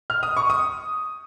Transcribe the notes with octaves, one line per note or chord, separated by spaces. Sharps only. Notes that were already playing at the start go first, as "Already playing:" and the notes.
F6
D#6
C#6
D#6